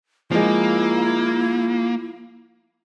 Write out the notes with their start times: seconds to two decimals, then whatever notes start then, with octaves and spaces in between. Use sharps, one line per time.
0.31 F3 G#3 A#3 E4